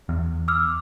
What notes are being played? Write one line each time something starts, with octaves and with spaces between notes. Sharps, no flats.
E2
D6 E6 F6